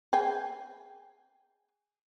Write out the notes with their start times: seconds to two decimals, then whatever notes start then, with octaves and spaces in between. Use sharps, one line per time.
0.13 G#4 G5 G#5